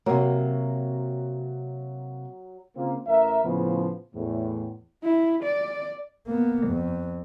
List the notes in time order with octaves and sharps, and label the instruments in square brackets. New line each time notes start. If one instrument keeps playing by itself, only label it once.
[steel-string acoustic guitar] C3 A#3 [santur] F#3
[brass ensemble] C#3 A#3 C4 F4
A1 A#4 E5
A2 C#3 F3 B3
E2 A2
[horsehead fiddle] E4
D5
[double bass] A#3 B3
F2